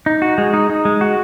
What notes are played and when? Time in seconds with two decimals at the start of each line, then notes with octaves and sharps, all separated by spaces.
0.06 D#4
0.22 F#4
0.38 G#3
0.54 D#4
0.70 D#4
0.85 G#3
1.01 F#4